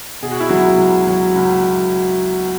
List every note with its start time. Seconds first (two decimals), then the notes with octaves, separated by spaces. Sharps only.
0.23 B2 G#4
0.31 F#4
0.40 E4
0.49 C#2 F#3 F#4
0.78 C#2
1.07 F#3
1.36 C#2